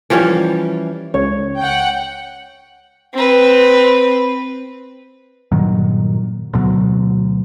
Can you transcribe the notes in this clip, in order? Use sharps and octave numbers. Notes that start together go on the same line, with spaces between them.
E3 F3 G3 C#4
C#2 C#5
F#5 G5
C4 B4
G2 A#2 D#3 F#3
D2 B2 F#3